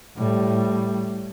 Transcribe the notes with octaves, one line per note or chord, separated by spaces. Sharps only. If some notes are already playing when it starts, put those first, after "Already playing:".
A2 G3